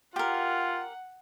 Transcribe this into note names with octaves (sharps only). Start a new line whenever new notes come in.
F4 G4 A#4 F#5